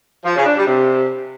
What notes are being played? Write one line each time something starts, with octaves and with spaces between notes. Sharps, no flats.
F3
C#3
D4
G3
C3